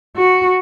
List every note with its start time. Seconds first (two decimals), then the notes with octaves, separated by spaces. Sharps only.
0.16 F#4